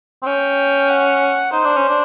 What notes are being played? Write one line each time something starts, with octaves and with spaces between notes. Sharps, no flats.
C4
C#4 G5
F#5
D#4 C5
D4
C#4
D4